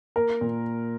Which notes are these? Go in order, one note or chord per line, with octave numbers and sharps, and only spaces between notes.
A#3 A#4
A#2